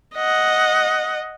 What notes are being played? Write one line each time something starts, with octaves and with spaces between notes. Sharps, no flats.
D#5 F#5